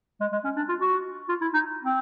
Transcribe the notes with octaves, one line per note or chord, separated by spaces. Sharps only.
G#3
G#3
C#4
D4
F4
F#4
F4
E4
D#4
C4